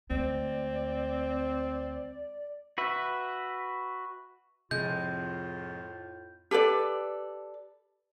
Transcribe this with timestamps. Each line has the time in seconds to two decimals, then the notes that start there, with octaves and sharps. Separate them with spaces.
0.10 D2 G#3 C4 D5
2.78 F#4 B4 E5
4.71 F2 A2 C3 F3 G#3 F4 G6
6.51 G4 A4 B4 D5